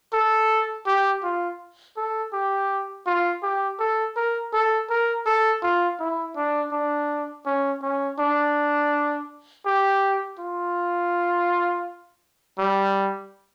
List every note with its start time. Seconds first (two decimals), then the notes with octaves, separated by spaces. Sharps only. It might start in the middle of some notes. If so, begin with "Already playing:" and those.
0.13 A4
0.87 G4
1.23 F4
1.97 A4
2.33 G4
3.06 F4
3.43 G4
3.80 A4
4.16 A#4
4.53 A4
4.90 A#4
5.26 A4
5.63 F4
5.99 E4
6.36 D4
6.72 D4
7.46 C#4
7.82 C#4
8.19 D4
9.66 G4
10.39 F4
12.59 G3